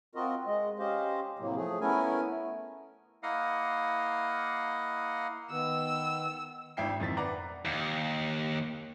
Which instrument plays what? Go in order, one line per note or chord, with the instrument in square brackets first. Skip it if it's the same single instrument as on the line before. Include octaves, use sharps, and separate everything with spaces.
[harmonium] C4 F4 F#4 A#4 D#5
G#3 D#5
C#4 G4 C5 D#5 F5
A2 C3 F#3 A#3
F3 A3 G#4
A3 B3 C#4 E4 A#4 G#5
[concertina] A#3 E4 D#5 F5 F#5
[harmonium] D#3 B3 [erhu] E6
[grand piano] G#1 D4 E4 G5 C7
F2 D#3 A6 B6
B4 D5 F#5 A#5
[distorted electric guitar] D#2